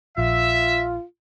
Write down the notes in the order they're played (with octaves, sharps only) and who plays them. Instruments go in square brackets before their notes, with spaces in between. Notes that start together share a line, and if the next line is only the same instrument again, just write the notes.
[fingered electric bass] A#1 [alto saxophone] F4 [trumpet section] E5